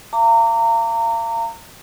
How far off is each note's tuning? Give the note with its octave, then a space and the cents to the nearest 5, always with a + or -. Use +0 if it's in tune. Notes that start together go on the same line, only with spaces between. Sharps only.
F5 -40 A#5 -30 D6 -25